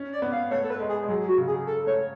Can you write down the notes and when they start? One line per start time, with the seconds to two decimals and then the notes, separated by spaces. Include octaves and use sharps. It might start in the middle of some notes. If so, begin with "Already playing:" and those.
Already playing: C#4
0.13 D5
0.22 B3
0.32 F5
0.51 A3 C#5
0.64 A4
0.70 B4
0.80 G#3
0.89 G#4
1.03 G#3
1.09 F#3 G#4
1.28 F#4
1.38 C#3
1.48 G#4
1.67 A4
1.87 A3 C#5